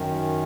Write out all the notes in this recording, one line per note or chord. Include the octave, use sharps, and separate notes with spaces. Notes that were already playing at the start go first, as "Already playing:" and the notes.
Already playing: F#2 D#3